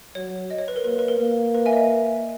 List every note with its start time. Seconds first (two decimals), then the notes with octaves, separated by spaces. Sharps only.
0.15 F#3 C#5
0.51 D#5
0.58 C#5
0.68 B4
0.76 A#4
0.84 A#3 B4
0.99 B4
1.08 A#4
1.20 A#3
1.54 B4
1.66 E5 G#5
1.73 D#5
1.77 E5